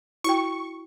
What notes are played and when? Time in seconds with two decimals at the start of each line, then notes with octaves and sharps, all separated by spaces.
0.24 E4 F#4 G5 C#6